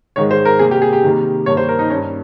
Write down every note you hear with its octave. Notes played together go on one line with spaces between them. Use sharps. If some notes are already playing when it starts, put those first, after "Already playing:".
G#2 D#3 G#3 C#5
C5
A#4
C3 G3 A#3 G#4
G4
G#4
G4
C3 D#3 G3 A#3
G2 D#3 A#3 C#5
C5
A#4
D#4
G2 G3 A#3 C#4